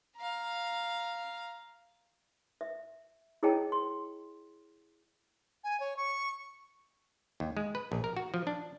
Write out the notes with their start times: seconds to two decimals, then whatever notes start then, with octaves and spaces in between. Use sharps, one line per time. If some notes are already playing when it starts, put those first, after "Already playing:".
0.17 F5 A#5
2.61 E5
3.43 E4 G#4 C#5 D#5 G5 A5
3.72 C6
5.64 G#5
5.80 C#5
5.97 C#6
7.40 D#2
7.57 G#3
7.75 B4
7.92 A#1
8.04 A#4
8.17 F#4
8.34 F3
8.47 D4